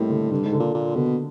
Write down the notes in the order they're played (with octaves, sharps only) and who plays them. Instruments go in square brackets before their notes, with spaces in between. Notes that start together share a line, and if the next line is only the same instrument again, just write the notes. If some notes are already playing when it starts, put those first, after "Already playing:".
Already playing: [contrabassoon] A2 [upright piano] G3 A#3 C4 D#4
[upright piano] D3
[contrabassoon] G2 [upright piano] D3
[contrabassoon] G#2
[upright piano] D3
[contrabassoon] A#2
[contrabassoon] A#2 [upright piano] A#3
[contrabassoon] B2 [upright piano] D3